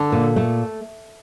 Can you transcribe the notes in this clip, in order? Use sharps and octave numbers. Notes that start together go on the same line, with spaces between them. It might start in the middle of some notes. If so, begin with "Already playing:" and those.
Already playing: D3 A4
A#2
A3